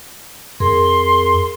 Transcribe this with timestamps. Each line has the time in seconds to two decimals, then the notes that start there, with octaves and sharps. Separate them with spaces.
0.60 F2 G#4 A#4 C6